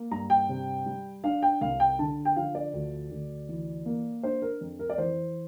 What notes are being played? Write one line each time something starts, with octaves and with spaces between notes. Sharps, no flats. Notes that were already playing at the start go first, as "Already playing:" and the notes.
Already playing: A#3
G2 A#5
G5
C3
G3
D4 F5
G5
C2 F5
G5
D3 A5
G5
F3 F5
D5
D2
D2
E3
A#3
D4 C5
A#4
F2
A#4
D5
E3 C5